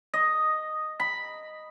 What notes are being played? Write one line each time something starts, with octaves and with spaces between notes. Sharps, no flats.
D#5
B5